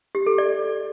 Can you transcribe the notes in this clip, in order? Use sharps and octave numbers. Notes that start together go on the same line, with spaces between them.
G4
A4
D5